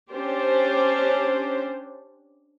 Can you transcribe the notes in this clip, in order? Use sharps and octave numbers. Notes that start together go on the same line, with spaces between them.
C#4 D4 G4 C5